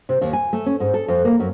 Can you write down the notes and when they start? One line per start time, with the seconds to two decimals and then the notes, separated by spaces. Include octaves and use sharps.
0.09 C3
0.21 D#2
0.33 G#5
0.53 A3
0.66 C#4
0.80 G#2
0.94 A4
1.08 F2
1.25 A#3
1.40 F#2